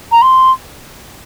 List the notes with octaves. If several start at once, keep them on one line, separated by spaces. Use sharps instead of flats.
A#5
C6